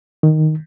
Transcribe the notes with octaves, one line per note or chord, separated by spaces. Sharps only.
D#3